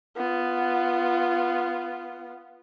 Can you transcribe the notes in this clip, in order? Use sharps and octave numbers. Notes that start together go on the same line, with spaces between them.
B3 F4